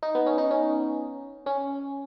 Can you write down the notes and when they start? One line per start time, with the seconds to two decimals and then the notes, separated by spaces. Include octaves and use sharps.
0.03 D#4
0.15 B3
0.26 C#4
0.38 D#4
0.51 C#4
1.46 C#4